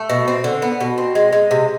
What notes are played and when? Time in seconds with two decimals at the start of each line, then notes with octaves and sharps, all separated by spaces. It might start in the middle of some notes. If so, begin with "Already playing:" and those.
Already playing: A3
0.10 B2
0.28 C4
0.44 D3
0.62 B3
0.80 B2
0.98 C4
1.15 G#3
1.32 G#3
1.51 C3